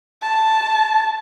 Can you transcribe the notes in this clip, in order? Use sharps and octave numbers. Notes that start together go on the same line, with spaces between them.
A5